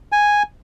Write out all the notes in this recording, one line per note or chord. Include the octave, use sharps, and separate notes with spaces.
G#5